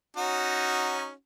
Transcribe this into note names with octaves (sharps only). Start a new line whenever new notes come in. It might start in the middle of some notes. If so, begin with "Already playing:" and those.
C#4 D#4 F#4